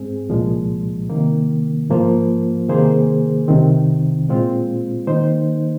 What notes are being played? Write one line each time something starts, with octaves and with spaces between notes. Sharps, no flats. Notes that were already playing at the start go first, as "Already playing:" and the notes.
Already playing: G#2 G#3 C4 G#4
C2 A#2 F3 G#3
C3 D#3 A#3
G#2 F3 A#3 F4 C5
C3 D#3 A#3 G#4 C5
C2 C3 D#3 C4
A#2 G#3 C4 F4
D#3 A#3 D#4 C5